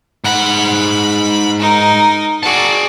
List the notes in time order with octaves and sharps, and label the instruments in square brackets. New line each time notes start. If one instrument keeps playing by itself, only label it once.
[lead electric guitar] G#2 F#5 [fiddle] B5
[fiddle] D#4 A#4
[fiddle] F#4 D5 [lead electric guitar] G#4 A5